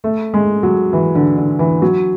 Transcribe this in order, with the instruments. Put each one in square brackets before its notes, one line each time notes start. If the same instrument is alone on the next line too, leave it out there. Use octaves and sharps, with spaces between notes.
[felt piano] A3
G#3
F#3
E3
D3
D3
E3
F#3